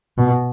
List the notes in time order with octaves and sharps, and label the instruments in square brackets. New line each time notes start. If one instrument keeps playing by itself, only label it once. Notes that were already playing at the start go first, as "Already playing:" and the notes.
[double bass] B2